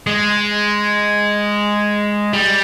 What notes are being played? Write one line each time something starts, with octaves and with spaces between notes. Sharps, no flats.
G#3
G3